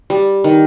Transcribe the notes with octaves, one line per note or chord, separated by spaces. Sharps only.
G3
D#3